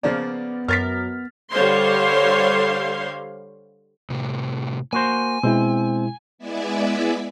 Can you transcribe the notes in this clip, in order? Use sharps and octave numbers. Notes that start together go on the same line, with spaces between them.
C#3 F3 A#3 B3 D5
F#2 A#4 F6 A6 B6
D3 G3 C5 C#5 F5 C6
A2 C3
A#3 F#4 C5 G#5
B2 G#3 C4 E4
G#3 B3 E4 G#4 D5 E5